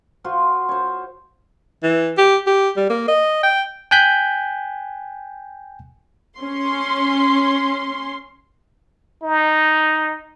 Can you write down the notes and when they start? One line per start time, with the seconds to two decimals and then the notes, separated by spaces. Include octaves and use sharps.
0.24 F4 F#4 C5 C6
0.69 C5 C#5
1.83 E3
2.18 G4
2.47 G4
2.77 G3
2.90 A#3
3.08 D#5
3.43 G5
3.91 G5 G#5 F#6 G6 B6
6.38 C#4 C6
9.23 D#4